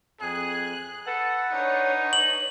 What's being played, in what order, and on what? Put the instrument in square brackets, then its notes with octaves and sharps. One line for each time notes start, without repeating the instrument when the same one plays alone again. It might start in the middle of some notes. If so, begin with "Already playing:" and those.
[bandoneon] F2 [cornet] G#4 [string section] F#6
[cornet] A4 [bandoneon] B4 F#5
[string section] D4 C#5 [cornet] D#4
[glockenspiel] F#7